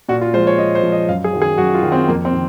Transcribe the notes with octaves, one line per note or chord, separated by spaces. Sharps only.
A#2 F#4
F4
F3 G#3 C5
C#5
A#2 D#5
C5
F3 G#3
D#5
F#2 F5
G#4
D#3 F#3
G#4
F#2 F#4
F4
D#3 F#3
C4
F2 A#3
C4
D#3